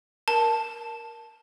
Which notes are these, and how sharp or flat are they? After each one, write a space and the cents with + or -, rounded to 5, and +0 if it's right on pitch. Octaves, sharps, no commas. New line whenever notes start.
A#4 +10 A5 +0